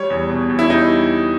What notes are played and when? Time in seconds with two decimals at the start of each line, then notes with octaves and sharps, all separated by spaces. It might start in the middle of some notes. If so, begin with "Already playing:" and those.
Already playing: G3 C#5
0.10 E2
0.30 B2
0.49 E2
0.59 E4
0.70 G3 D#4